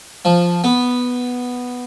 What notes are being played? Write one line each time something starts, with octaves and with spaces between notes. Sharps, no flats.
F3
B3